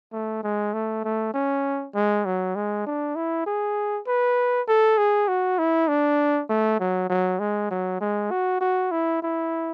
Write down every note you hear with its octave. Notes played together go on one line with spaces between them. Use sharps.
A3
G#3
A3
A3
C#4
G#3
F#3
G#3
D4
E4
G#4
B4
A4
G#4
F#4
E4
D4
A3
F#3
F#3
G#3
F#3
G#3
F#4
F#4
E4
E4